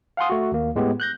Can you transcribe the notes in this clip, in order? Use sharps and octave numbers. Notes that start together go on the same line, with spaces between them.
F5 F#5 G#5 C6 D#6
A3 F#4
D#2 A#3
A2 G#3 B3 G4
F#6 G6 A#6